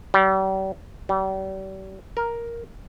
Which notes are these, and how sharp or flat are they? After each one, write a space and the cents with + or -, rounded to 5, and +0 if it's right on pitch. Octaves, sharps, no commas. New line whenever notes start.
G3 -40
G3 -40
A#4 +5